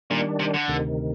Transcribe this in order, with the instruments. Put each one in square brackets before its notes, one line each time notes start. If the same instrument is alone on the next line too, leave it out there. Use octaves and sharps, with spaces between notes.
[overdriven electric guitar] A#2 [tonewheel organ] D#3 G3 D4
[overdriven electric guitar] C3
D3
[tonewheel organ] D2 C3 D#3